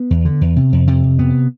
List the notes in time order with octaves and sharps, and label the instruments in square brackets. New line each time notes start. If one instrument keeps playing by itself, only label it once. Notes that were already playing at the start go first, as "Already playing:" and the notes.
Already playing: [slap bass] B3
E2
D3
E2
C3
F2
C3
F2
C3 B3